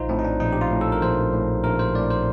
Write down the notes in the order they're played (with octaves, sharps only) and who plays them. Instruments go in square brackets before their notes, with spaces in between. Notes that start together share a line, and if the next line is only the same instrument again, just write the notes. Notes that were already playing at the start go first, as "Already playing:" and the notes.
Already playing: [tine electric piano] A#1 D#4 F4 C5
A2 C4
D#4
D4
A#1 D#4
G4
F4
A2
A4
A#4
A#1 C5
A2
A#1 A#4
C5
A2 D5
C5